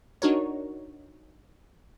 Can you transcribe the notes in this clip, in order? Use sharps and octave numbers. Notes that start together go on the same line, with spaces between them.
D4 D#4 F#4 A#4 C#5